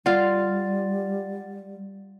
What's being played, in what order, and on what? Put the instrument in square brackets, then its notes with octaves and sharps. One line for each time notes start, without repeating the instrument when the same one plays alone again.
[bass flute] G3 [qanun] F4 F5 [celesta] D5 F#5 A6